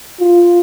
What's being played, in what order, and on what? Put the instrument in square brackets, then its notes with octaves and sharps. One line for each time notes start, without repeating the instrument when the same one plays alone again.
[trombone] F4